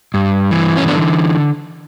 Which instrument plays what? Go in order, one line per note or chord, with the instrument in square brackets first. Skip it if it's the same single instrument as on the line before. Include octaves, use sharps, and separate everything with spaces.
[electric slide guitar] G2
E3
C#4
D3 B3 D4